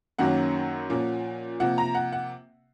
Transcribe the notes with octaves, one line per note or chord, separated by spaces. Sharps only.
F#2 D#3 F#3 A#3 C#4 F#5
A#2 F3 A#3 C#4
C3 F3 A#3 F#5
A#5
F#5
F#5